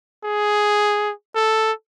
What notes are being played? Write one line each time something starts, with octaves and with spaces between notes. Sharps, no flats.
G#4
A4